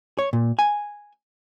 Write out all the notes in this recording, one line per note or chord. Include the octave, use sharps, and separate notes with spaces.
C#5
A#2
G#5